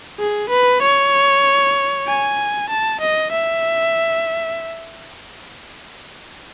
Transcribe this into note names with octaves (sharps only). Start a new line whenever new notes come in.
G#4
B4
C#5
G#5
A5
D#5
E5